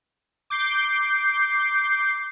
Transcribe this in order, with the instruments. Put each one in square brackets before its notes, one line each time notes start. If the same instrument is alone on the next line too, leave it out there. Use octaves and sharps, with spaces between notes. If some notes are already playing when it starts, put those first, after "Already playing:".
[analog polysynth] D6 G6 C7